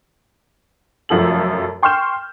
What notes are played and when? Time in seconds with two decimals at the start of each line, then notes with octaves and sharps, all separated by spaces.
1.09 F1 F#2 F3 A4 F#7
1.83 G5 C6 C#6 F6 G6 E7